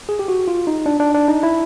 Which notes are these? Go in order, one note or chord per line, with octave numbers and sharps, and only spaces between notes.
G#4
G4
F#4
F4
D#4
D4
D4
D4
D#4
E4